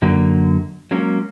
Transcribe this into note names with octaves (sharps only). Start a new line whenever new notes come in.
F#2 D3 F#3 A#3
F#3 G#3 A#3 C#4